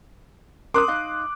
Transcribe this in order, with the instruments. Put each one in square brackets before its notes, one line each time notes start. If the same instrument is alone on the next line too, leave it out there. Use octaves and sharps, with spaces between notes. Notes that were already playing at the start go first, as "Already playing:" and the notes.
[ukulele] C#4 A#4 A#5 [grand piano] C6 D#6 [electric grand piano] D6 F#6
[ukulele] D#4 D#5 F5